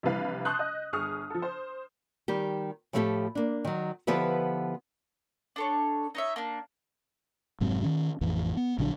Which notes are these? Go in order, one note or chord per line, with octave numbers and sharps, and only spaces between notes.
A#1 C3 E3 G3 B4 F5
A5 C6 C#6 D#6 F#6 G6
D#5
G1 G#4 C#6 D#6 F6
F3 A4
C5
D#3 G3 G4
A2 F3 A3 F4 G4 A4
A#3 D4
D#3 F#3
D3 F3 B3 E4 G4 B4
D4 A4 C#5
D#4 C#5 E5
A#3 D4
F1 G#2 F#3 C4
D#3 C#4
A1 F2 E3
B3
A#1 D3 F#3 D4